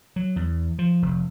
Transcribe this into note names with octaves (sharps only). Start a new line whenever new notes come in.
F#3
E2
F3
F1